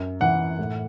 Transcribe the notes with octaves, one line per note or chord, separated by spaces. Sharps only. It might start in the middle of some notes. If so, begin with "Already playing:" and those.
Already playing: F#2
E3 F#5
A2